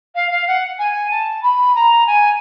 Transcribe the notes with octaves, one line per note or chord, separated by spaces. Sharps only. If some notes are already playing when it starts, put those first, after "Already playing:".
F5
F5
F#5
G#5
A5
B5
A#5
G#5